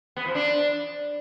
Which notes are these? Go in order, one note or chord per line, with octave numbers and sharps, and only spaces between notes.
B3
F3
D4